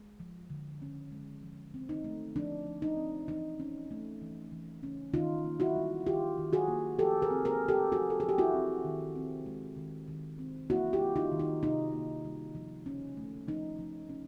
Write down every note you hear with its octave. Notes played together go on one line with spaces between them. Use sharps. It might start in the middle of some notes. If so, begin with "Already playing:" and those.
Already playing: G#3
F3
D3
C#4
G#3
F3
C4
D#4
A3
F3 D4
F3
D#4
C4
E3 D#4
C#4
A3
E3
E3
C#4
D#3 D#4 F4
A#3
E4 F#4
G3
D#3 F4 G4
D#3
F#4 G#4
A#3
F3 G4 A4
G#4 A#4
C4
G#4 A#4
G#3
G4 A4
F3 F#4 G#4
A4
F3 G#4
G4
E4 F#4
C4
D#3
C4
G#3
D#3
D#3
C4
A#3 E4 F#4
F4 G4
G3
D#4 F4
D#3
D#4
C3 D#4
A#3
G3
F3
C#4
A3
F3 D#4
F3
C#4